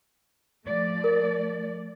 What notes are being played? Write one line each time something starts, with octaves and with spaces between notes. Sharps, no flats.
F3 A3 D5
A#4